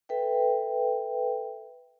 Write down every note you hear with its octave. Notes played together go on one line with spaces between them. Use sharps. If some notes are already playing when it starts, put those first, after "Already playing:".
A4 B4 E5 G5